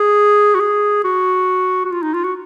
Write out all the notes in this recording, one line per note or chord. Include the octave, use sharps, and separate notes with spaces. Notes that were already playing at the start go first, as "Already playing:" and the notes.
Already playing: G#4
F#4
G#4
F#4
F#4
F4
D#4
F4
F#4